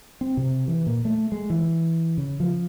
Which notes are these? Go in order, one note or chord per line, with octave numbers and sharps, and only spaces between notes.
C4
C3
E3
A#2
A3
G#3
E3
C#3
F3